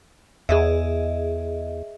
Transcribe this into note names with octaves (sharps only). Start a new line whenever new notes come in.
E2 G#4 D#5 E5